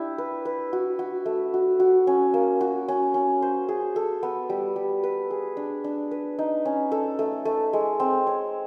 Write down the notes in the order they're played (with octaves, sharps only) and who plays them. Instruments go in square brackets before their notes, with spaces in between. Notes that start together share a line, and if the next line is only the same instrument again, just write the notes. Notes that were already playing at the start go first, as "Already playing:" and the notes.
Already playing: [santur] D4 E4 G4
B4
B4
F#4
F#4
A3
F#4
F#4
C#4
A#3
F#4
C#4
C#4
C5
G#4
A4
B3
G3
G3
B4
G#4
D4
D4
B4
D#4
C#4
A4
A3
A3
G#3
C4
C#5